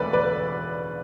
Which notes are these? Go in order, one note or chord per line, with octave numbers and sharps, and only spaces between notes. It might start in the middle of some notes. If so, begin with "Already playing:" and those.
Already playing: E1 D2 A4 B4 D5
B4 D5